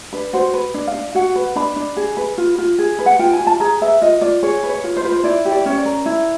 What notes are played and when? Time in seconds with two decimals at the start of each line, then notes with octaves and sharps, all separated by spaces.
0.13 D4 B4
0.33 F#4 C5
0.54 B4
0.74 D4
0.87 F5
0.94 D4
1.15 F#4 F#5
1.36 B4
1.56 D4 B5
1.76 D4
1.97 G#4
2.17 B4
2.38 F4
2.58 F4
2.78 G#4
2.99 B4
3.06 F#5
3.19 F4 G5
3.33 G#5
3.40 F4
3.47 A5
3.60 G#4 A#5
3.81 B4 E5
4.01 F4 D#5
4.21 F4 D5
4.43 G#4 C#5
4.63 B4
4.69 C#5
4.84 F4
4.97 C5
5.04 F4 B4
5.12 C5
5.24 E4 D5
5.45 G4
5.52 D5
5.66 C#4 C#5
5.78 D5
5.85 A#4
6.06 E4